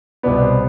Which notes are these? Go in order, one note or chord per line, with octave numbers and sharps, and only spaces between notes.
C2 B2 B3 D5
C5